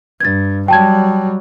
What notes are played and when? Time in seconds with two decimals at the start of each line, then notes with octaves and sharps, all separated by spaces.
0.21 G2 G#6 A6
0.68 F#3 G3 G5 A5 G#6